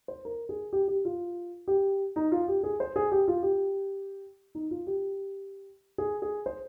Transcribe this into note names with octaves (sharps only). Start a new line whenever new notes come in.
C5
A#4
G#4
G4
G4
F4
G4
D#4
F4
G4
G#4
C5
G#4
G4
F4
G4
D#4
F4
G4
G#4
G#4
C5